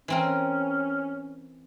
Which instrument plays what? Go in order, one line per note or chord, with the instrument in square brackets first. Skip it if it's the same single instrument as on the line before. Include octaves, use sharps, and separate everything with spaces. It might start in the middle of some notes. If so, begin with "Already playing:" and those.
[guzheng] E3 C4 A#4 [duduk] C#4